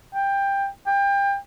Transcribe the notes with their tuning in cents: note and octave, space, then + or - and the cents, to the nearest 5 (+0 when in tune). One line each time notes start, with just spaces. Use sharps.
G5 +15
G5 +30